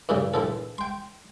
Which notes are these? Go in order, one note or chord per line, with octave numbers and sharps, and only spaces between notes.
E2 G2 A#2 C#3
A#1 E3 A4
G5 C6